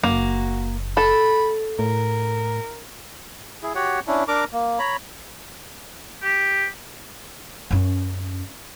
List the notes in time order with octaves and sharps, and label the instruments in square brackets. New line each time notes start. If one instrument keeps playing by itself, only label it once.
[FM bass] F#1 [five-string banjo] A#3 [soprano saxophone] F#4
[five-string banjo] A4 [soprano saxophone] B5
[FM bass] A2 [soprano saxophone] A#4
[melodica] E4 G#4
F#4 G4 C#5 F#5
C#4 D4 E4
D4 A#4 A#5 D6
A#3
C#5 A#5 B5
[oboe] G4
[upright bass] F#2 C#4